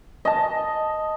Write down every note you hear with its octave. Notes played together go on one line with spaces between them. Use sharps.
D#5 A5